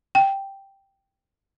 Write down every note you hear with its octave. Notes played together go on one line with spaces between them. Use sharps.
G5